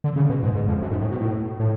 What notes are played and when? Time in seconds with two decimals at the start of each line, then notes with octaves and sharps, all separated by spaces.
0.04 D3
0.16 C#3
0.30 B2
0.43 G#2
0.55 G#2
0.68 F2
0.82 F#2
0.91 G#2
1.01 A2
1.11 B2
1.21 A2
1.60 A2